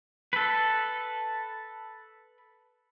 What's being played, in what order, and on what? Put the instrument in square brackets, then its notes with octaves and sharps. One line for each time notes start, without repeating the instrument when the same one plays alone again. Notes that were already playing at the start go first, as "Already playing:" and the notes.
[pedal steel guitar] A4 B4